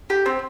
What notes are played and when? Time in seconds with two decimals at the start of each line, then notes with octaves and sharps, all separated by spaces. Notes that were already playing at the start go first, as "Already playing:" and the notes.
0.10 G4
0.26 C4